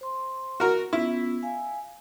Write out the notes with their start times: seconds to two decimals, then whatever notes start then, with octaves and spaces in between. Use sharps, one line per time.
0.01 C5 C6
0.60 F#4 A#4
0.93 B3 C#4 E4 F4
1.43 F5 G#5